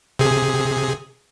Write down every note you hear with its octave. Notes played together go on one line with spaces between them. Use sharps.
C3 G#4